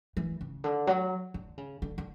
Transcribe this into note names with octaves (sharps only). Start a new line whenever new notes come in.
E3
C#3
D3
F#3
D3
C#3
D3
D3